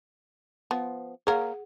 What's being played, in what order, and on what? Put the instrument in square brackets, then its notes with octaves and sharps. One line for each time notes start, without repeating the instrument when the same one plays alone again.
[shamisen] F3 B3
[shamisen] A#3 A#4 C#5 [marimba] G#4 F#5